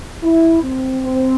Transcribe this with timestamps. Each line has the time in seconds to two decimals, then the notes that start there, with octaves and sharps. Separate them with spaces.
0.23 E4
0.63 C4
1.04 C4